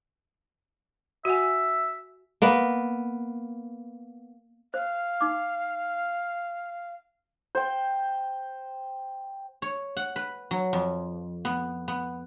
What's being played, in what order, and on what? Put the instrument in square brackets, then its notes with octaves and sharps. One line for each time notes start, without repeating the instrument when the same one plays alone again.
[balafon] F#4 F#5 G#5 [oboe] E5
[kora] A#3 B3 B4
[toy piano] C5 [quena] F5
[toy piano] D#4 D6
[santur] C5 G5
[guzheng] C#5
F#5
B4
F#3
F2
B3
B3